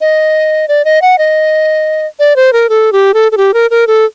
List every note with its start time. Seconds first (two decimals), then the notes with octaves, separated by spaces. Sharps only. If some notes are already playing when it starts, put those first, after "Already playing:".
0.01 D#5
0.68 D5
0.85 D#5
1.02 F#5
1.18 D#5
2.19 D5
2.36 C5
2.53 A#4
2.69 A4
2.93 G4
3.14 A4
3.32 A4
3.37 G4
3.54 A#4
3.71 A#4
3.87 A4